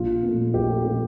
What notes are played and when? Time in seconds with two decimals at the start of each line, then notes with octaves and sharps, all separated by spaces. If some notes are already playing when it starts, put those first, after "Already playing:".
Already playing: A#1 F4
0.23 A#2 A3
0.54 A#1 G4
0.70 A4
0.85 A#2 A3 G4